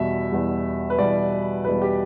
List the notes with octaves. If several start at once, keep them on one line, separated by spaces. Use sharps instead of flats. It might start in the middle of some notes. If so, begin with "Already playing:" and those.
Already playing: E2 B2 G3 E5
E2 B2 G3
B4
E2 B2 G3 D5
E2 B2 G3 B4
G4